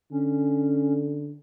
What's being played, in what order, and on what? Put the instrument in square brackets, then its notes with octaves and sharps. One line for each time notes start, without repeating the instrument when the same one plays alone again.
[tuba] D3 [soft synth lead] C#4